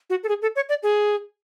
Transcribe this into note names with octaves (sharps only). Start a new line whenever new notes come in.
F#4
A4
G#4
A4
C#5
D5
G#4